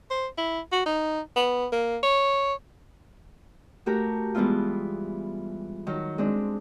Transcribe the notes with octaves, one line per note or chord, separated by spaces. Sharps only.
C5
E4
F#4
D#4
B3
A#3
C#5
A3 F#4 G4 A#4
E3 G3 G#3 B3 E4 F4
D#3 F#3
G#3 C4 D4